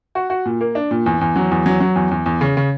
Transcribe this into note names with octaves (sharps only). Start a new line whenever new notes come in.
F#4
F#4
A#2
A#3
D4
A#2
E2
E2
F#3
E2
F#3
F#3
E2
E2
E2
C#3
C#3